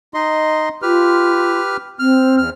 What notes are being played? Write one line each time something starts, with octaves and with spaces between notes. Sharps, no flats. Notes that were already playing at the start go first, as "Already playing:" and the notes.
D#4 D#5 C6
F4 G4 B4 F6
C4 F6
E2 F6